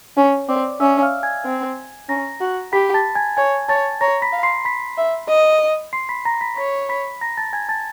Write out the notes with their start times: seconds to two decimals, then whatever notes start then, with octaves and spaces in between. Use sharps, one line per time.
0.17 C#4 C#5 C#6
0.49 C4 D5 D6
0.80 C#4 E5 E6
1.02 F5 F6
1.23 G#5 G#6
1.45 C4
2.09 C#4 A#5 A#6
2.41 F#4
2.73 G4 B5 B6
2.94 A5 A6
3.15 G#5 G#6
3.37 C#5 G#5 G#6
3.68 C#5 A5 A6
4.01 C#5 A#5 A#6
4.22 B5 B6
4.32 F5
4.43 C6 C7
4.65 B5 B6
4.97 E5
5.28 D#5
5.93 C6 C7
6.09 B5 B6
6.25 A#5 A#6
6.41 B5 B6
6.57 C#5 B5 B6
6.89 B5 B6
7.21 A#5 A#6
7.37 A5 A6
7.53 G#5 G#6
7.69 A5 A6